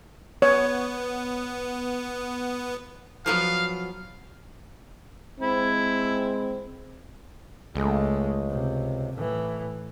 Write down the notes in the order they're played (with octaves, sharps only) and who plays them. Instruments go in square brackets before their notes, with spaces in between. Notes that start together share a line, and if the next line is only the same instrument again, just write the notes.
[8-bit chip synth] B3 [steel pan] C#5
[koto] F3 F#3 B3 [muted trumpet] F5
[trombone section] G#3 C4 [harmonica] E4
[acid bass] C#2 [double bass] G#3 A3
[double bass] C3
A2 E3